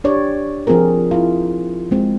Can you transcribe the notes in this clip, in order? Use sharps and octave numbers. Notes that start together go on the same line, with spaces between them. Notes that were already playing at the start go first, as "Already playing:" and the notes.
D4 G4 C#5 D5
F3 C4 F4 G#4 A#4
E4 F4
G#3 C4